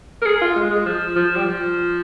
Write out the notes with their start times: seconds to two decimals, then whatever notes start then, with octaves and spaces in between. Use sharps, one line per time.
0.22 A#4
0.26 G#4
0.41 F4
0.56 G#3
0.71 G#3
0.85 F3
1.16 F3
1.36 G3
1.46 F3